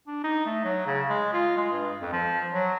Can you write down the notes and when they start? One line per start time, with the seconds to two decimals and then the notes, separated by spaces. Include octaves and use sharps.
0.07 D4
0.24 D#4
0.46 A3
0.64 F#3
0.87 C#3
1.10 G#3
1.33 F4
1.57 G#3
1.72 G2
2.01 F2
2.13 F3
2.51 F#3